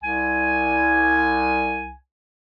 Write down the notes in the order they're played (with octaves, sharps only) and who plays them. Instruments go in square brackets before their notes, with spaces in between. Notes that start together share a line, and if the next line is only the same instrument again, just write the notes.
[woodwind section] C2 G#5